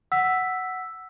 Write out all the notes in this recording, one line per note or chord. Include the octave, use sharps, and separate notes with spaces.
F#5 E6 B6